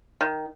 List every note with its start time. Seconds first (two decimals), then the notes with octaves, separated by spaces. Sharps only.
0.21 D#3